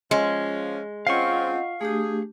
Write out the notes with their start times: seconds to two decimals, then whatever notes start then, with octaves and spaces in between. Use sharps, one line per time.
0.11 F3 G#3 C#4
1.07 C4 C#4 F4 D#5 F5 F#5 C#6
1.81 A3 D4 G4 G#4